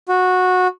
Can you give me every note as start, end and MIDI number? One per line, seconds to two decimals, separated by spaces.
0.09 0.67 66